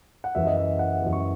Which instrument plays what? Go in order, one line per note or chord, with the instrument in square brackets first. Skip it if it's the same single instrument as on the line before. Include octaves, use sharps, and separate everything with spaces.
[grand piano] F#5
F#2 E3 E5
D#5
E5
F#5
F#2 E3
C#6